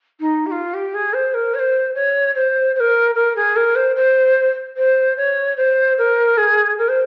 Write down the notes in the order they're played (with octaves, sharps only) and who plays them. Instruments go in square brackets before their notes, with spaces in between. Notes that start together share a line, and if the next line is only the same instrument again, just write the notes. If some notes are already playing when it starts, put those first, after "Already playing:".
[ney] D#4
G4
F4
G4
G#4
C5
A#4
C#5
C5
C#5
C5
C5
A#4
A#4
G#4
A#4
C5
C5
C5
C#5
C5
A#4
G#4
A#4
C5